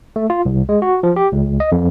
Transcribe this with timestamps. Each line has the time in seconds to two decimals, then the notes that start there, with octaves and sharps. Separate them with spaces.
0.16 A3
0.30 F4
0.45 C2
0.69 G#3
0.82 F#4
1.03 F3
1.16 G4
1.32 C#2
1.60 D#5
1.72 F2